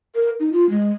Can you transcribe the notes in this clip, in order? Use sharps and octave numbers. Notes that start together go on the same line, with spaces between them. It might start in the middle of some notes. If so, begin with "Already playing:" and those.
A#4
D#4
F4
G#3